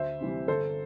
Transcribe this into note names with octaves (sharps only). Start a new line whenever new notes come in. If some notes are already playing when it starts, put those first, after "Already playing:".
Already playing: D2 C5 E5
C3 E3 G3
G1 A4 C5